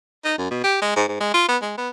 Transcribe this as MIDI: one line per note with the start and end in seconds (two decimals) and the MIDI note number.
0.24 0.36 63
0.38 0.50 42
0.51 0.61 47
0.64 0.78 67
0.82 0.96 56
0.96 1.05 44
1.08 1.17 44
1.20 1.32 56
1.34 1.44 65
1.48 1.57 59
1.62 1.75 56
1.77 1.89 59